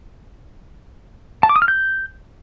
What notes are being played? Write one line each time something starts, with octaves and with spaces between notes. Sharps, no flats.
A5
D6
D#6
F6
G6